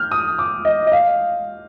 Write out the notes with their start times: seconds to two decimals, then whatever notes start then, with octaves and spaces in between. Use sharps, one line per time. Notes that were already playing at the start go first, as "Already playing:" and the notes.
Already playing: F6 G6
0.12 D#6
0.39 D6
0.65 D#5
0.87 D#5
0.92 F5